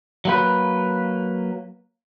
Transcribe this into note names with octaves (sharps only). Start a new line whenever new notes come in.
F#3 A#3 B4